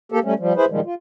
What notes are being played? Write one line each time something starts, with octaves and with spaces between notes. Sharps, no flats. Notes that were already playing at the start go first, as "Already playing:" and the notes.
A#3 G4 A4
G3 A3 C#4
F3 G3
E4 G#4 B4 C5
A#2 D#3 F3 G3 G#3
F4